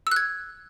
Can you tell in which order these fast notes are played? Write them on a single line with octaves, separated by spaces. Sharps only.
E6 F#6 G#6